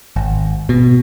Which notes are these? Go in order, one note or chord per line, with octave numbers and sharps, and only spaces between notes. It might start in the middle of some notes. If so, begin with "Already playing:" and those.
G#1
B2